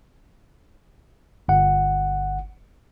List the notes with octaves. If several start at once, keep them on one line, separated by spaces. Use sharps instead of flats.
G1 F#5